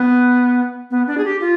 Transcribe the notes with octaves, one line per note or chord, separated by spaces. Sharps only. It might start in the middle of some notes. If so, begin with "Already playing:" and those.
Already playing: B3
B3
D4
G#4
G4
F4